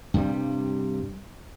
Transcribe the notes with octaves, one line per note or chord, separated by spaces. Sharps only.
G2 C3 G3